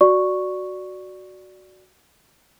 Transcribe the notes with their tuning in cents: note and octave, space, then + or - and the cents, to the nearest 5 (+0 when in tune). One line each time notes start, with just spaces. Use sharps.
F#4 +0 D5 +0 C#6 +0